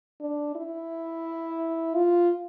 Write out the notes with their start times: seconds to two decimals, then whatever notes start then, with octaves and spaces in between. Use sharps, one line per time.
0.21 D4
0.55 E4
1.95 F4